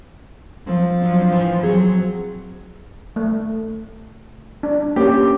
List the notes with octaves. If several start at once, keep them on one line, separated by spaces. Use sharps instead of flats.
F3 C4
F#3 C4 D4
A2 E3
F#3 C4 G#4
A3
D4
A#3 C#4 G4